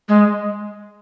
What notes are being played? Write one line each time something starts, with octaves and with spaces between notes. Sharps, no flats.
G#3